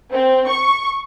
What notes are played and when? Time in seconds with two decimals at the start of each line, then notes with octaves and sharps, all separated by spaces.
0.13 C4
0.50 C#6